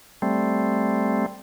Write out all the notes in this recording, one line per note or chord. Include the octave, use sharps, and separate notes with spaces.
G3 A3 C4